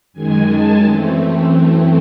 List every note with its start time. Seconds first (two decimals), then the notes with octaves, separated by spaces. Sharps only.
0.13 F#2 D#3 G#3 G#5
0.48 A5
0.83 F#2 E3 A3 C4